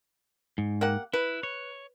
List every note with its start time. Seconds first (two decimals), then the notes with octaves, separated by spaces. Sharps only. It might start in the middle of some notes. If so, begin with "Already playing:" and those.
0.58 G#2
0.81 A#3 G4 F#5
1.13 E4 B4
1.43 C#5